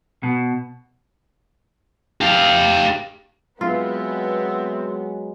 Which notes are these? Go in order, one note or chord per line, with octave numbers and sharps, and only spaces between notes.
B2
G4 F5
F#3 G#3 B3 C4 F4 E5